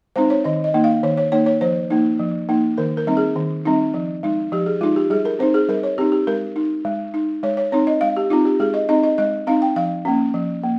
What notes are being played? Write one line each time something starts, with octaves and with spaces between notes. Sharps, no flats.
G#3 C4 D#4 C5
C#5
D#3 D#5
D#5
A#3 D#4
F5
D#3 C#5
C#5
A#3 D#4 C#5
C#5
F3 C5
A#3 D#4
F3
A#3 D#4
D#3 A#4
A#4
G3 C4 D#4
G#4
D#3
G3 C4 D#4
F3
G#3 D#4
F3 G4
G#4
G#3 D#4 F4
G4
G3 G#4
A#4
C4 D#4 C5
G#4
G3 A#4
C#5
C4 D#4 G4
G4
G#3 A#4
D#4
G#3
D#4
G#3 C#5
C#5
C4 D#4 C#5
D#5
G#3 F5
G4
C4 D#4 F4
G4
G#3 G#4
D#5
C4 D#4 D#5
D#5
G#3 D#5
C4 D#4 F5
G5
F3 F5
A#3 C#4
F3
A#3